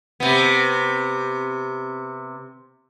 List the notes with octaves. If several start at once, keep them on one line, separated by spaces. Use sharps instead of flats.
C3 B3